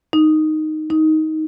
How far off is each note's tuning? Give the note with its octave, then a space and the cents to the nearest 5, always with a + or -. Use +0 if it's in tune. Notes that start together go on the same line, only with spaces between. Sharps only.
D#4 -5
D#4 +15